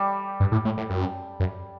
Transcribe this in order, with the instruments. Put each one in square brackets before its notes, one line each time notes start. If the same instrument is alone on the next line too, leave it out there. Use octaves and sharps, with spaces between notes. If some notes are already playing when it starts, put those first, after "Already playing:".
Already playing: [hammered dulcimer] G3 G4 A4
[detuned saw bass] G2
A2
A2
A2
F#2
F#2